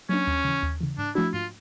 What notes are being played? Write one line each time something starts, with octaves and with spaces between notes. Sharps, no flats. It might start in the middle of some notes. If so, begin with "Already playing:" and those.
F#3 A#3 C#4 D4
D#2
C#3 E3
D#2
C#3 E3
G#2 D4
F3 A3 D4 E4 F#4
G#2 F4